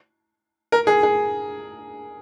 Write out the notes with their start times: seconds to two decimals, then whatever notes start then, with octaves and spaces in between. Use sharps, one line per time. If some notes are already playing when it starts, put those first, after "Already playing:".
0.72 A#4
0.87 G#4
1.03 G#4